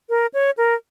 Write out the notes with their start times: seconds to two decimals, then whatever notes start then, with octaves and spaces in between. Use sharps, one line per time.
0.09 A#4
0.34 C#5
0.57 A#4